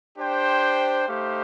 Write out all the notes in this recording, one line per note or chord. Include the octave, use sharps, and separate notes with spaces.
D4 G4 C5 G5
A3 D#4 G4 C5 F5